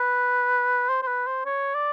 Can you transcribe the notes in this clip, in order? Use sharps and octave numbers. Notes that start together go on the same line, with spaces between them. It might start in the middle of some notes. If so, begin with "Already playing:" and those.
Already playing: B4
C5
C5
B4
C5
C#5
D5